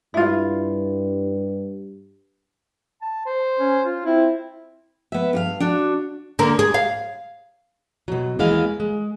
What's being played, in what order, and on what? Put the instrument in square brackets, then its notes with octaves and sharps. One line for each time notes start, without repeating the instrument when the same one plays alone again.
[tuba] G2 [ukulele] E4 F4
[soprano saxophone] A5
C5
[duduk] C#4
F4
[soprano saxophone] C4 [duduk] E4
[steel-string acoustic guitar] B3 E5
G2 A4 F5
D4 F#4
[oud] D3 A#3
G#4
F5
[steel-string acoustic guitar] B2 F#3
D#2 E3 G#3 B3 F5
G#3